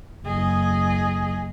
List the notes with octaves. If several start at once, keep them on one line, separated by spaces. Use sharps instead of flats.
F#1 G#4 D#5